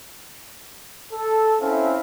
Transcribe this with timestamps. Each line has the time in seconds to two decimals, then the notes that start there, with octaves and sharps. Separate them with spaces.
1.13 A4
1.61 C4 C#4 E4 E5 F5